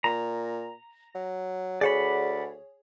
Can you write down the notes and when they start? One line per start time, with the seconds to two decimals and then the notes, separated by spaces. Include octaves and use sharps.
0.04 A#2 A#5
1.15 F#3
1.81 D2 G#4 C#5 D5 F#5 B5